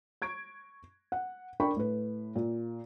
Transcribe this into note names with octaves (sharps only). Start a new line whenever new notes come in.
C#6 G#6 D7
F#5
D4 A#4 D5 G5 B5 C#6
A2 B4
A#2